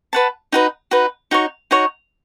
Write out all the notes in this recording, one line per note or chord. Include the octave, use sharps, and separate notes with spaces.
B4 F#5 A5
D#4 F#4 B4
D#4 F#4 B4
D#4 F#4 C#5
D#4 F#4 C#5